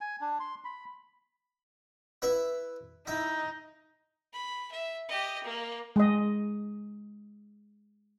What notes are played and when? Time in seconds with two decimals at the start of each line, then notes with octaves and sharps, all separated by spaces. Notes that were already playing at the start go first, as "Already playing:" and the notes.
0.01 G#5
0.21 D4
0.40 C6
0.64 B5
2.22 E4 B4 E5
3.07 D#4 E4
4.33 B5
4.71 E5
5.08 G4 D#5
5.44 A#3
5.96 G#3 D#5